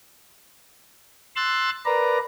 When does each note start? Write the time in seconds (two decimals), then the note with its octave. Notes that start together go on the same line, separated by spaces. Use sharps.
1.36 C6 E6 F#6 A6
1.85 A#4 B4 D5 A#5